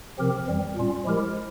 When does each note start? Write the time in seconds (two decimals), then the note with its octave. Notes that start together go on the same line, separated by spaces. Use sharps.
0.18 C3 F3 C4 G4 A#4
0.47 F2 E3 G3 C4
0.76 A#2 G3 C#4 F4
1.05 F3 G#3 E4 G4 A#4